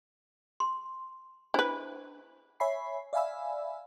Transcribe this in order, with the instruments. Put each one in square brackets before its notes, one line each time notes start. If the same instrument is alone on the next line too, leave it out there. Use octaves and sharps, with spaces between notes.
[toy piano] C6
[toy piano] D4 C5 [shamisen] E4 B4
[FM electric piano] C#5 E5 G#5 B5 C7
D5 E5 F5 G#5 B5 E6